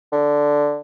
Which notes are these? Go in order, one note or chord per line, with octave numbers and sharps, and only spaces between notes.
D3